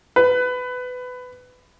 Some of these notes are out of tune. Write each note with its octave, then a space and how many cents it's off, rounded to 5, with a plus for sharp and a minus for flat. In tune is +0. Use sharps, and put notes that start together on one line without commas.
B4 +20